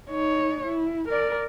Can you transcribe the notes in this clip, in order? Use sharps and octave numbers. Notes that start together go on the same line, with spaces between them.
D#4 C#5
E4
A#4 D5